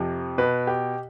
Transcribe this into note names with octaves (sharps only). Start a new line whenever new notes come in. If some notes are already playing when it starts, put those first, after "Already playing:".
Already playing: F2 C3 F3
B2 B4
G4